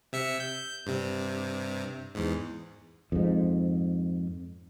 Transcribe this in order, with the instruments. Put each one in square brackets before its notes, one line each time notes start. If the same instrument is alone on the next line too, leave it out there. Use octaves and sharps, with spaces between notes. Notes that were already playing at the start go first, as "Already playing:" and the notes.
[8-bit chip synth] C3 E5 C#7
G6
G2 C3
E2 G#2
[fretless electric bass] F2 G#2